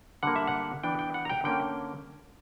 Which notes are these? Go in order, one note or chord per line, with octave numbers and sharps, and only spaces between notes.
D3 G3 A#3 F#5
E5
F#5
E3 B3 D4 G5
G5
F#5
A#5
G5
D3 A#3 C#4 G5